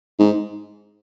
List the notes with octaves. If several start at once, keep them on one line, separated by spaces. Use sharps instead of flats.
G#2